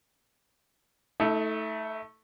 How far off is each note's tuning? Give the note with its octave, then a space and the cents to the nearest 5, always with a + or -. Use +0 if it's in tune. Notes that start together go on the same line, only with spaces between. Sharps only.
A3 +0 D#4 +45 A4 +0